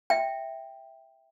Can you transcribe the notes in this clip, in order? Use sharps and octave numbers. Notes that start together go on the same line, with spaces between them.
E5 G5